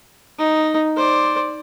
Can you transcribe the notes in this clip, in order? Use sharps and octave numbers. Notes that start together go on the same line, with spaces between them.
D#4
C5 D5